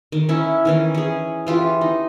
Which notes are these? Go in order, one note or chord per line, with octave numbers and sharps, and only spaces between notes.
D#3
C#4 E4
D#3 E3 C#4
C#4 G#4
E3 F4 G4
D#4